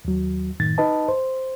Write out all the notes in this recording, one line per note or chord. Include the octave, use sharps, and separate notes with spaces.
D#2 F#3
F#2 A2 D#3 A6
D#4 B4 D#5 A5
C5